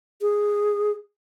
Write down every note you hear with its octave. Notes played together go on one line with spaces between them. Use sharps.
G#4